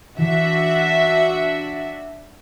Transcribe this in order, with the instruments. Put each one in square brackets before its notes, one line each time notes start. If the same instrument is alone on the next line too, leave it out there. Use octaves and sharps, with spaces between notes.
[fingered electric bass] E3 [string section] D4 F#4 E5